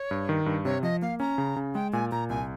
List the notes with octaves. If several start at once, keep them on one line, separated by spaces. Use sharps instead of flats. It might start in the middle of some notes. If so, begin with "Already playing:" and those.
Already playing: C#5
G2
D#3
G2
C3 C#5
F3 D#5
A#3 F5
C#4 A#5
C#3
C#3
G#3 G5
A#2 G#5
A#2 A#5
C2 G#5